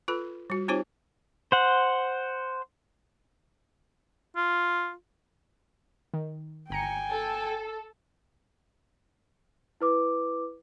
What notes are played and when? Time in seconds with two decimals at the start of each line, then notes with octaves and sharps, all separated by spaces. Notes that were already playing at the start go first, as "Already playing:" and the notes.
0.08 F4 A4 B4 B5
0.50 G3 F#4
0.68 C4 D#4 F4 G4 C5 C#5
1.52 C5 F#5
4.36 F4
6.14 D#3
6.70 G1 G5 G#5 A#5 C#7
7.11 A4
9.81 E4 B4 D6